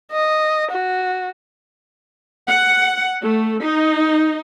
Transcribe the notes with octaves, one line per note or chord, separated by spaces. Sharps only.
D#5
F#4
F#5
A3
D#4